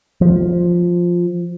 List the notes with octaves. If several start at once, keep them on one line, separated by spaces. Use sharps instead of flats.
F3